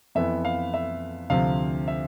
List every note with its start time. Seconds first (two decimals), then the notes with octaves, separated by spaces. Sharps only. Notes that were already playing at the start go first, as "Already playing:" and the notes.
0.15 F2 E3 B3 E5
0.45 F5
0.74 E5
1.30 D2 C3 F3 C4 F5
1.88 E5